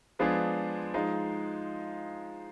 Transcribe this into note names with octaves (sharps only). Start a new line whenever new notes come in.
F3 G#3 B3 D4 G#4
F3 G#3 D#4